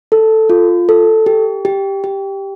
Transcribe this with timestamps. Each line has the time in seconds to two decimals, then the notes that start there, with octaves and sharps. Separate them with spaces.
0.12 A4
0.50 F4
0.89 A4
1.26 G4
1.65 G4
2.04 G4